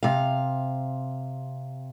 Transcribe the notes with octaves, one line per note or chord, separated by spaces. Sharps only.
C3 F5